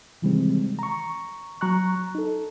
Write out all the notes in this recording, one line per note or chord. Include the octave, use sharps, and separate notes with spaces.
C3 D#3 E3 G3 G#3 C4
A#5 C#6
F#3 A#5 C#6 F#6
D#4 A4